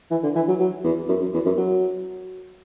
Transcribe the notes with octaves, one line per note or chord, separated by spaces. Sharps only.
E3
D3
E3
F#3
F#3
E2
F#2
F#2
E2
F#2
F#3